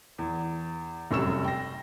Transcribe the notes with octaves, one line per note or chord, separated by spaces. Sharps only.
E2
F1 F#2 G3 C#6 E6 E7
G5 A#6